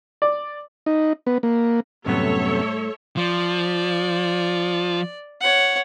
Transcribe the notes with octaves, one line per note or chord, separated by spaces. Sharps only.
D5
D#4
B3
A#3
F#2 A2 C3 G3 B3 A4 C#5 E5
F3 D5
C#5 F#5